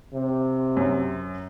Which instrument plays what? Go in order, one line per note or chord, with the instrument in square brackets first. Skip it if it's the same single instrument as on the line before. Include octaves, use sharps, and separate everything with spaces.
[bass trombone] C3
[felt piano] F#2